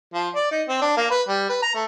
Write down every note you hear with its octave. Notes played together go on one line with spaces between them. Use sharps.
F3
D5
D#4
C4
D4
A#3
B4
G3
B4
A#5
A3